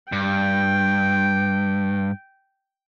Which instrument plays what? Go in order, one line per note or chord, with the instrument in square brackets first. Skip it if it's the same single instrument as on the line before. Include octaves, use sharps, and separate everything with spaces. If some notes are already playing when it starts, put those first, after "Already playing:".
[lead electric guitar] G2 [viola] G5